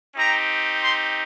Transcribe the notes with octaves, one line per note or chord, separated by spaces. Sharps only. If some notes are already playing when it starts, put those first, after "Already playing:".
C4 D#4 G4 A#5
C6